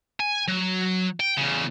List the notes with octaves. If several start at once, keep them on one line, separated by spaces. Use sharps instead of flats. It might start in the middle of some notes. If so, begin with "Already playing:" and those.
G#5
F#3
G5
E2 C#3